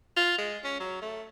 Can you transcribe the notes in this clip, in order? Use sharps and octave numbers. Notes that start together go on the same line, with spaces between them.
F4
G#3
C#4
F#3
A3